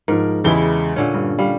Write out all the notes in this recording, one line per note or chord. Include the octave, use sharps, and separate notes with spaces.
G#2 F3 A#4
E2 C#3 G#3 E4 G4 G7
A#2 D3 C#4
G2
G3 F5